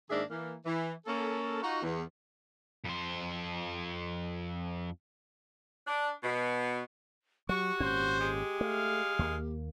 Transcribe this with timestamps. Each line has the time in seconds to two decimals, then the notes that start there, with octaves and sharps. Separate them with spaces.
0.10 G#2 D#3 A#3 D4 G#4 E5
0.30 E3 A#3
0.66 E3
1.06 A#3 C#4 A4
1.62 D#4 F4 F#4
1.82 E2
2.84 F2 C5
5.87 D4
6.23 B2
7.49 F#3 F#4 G4 C#6
7.80 G#1 A#2 C#4 C5
8.20 G#3
8.61 A3 F5
9.19 D#2 A#3